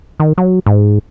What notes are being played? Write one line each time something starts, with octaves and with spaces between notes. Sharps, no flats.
D#3
F#3
G#2